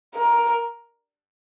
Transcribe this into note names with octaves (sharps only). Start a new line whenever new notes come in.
A#4